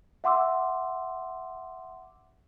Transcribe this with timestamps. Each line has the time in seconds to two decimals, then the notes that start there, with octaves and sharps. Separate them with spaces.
0.24 E5 F#5 C6 D6 E6